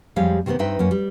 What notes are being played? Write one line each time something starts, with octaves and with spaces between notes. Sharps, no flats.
F2 G3 G#3 G4 C#5 F5
C3 D#3 G3 B3 C4
G2 C4 D#4 B4 E5 G5
F#2 A#3 C#4
G3